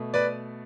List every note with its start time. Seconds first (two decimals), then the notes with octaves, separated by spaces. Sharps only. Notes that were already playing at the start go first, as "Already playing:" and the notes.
Already playing: B2 A3
0.14 B4 D5